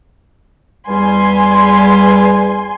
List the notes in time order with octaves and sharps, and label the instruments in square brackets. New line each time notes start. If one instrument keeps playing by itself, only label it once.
[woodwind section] E2 G3 [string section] G#5 C6